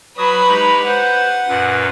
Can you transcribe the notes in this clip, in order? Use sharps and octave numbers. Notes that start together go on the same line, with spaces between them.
F#3 F#4 B4 B5 D#6
G#3 D#4 G4
B4 C5 F#5
F#2 A#2 B4